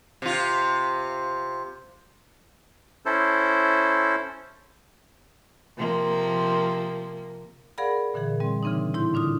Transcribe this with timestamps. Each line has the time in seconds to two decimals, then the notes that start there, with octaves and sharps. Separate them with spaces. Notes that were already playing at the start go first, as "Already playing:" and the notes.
0.22 C3 F4
3.06 C#4 E4 A4 C5
5.77 C3 F3 A#3
7.78 G#4 A#4 D5 F5 F#5 B5
8.14 A#2 D3 E3 G#4
8.40 G3 C4 C6
8.63 C#3 E3 C4 D4 D#4
8.94 A2 E4 C6 G6
9.13 A2 D3 D4 F4 D#6